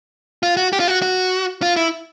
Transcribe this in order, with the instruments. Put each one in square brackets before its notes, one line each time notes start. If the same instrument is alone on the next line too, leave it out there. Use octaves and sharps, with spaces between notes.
[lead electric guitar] F4
F#4
G4
F4
F#4
F#4
F4
E4